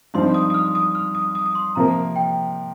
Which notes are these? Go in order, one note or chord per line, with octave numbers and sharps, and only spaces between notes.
G2 F3 C4 D#4 C6
D#6
D#6
F6
D#6
F6
D#6
D#6
D#6
C6
C3 F3 A#3 A#5
G5